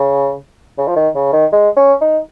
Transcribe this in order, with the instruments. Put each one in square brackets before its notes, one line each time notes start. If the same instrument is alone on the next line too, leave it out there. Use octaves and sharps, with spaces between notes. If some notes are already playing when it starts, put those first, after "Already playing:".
Already playing: [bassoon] C#3
C#3
F3
D#3
C#3
D#3
G#3
C#4
D#4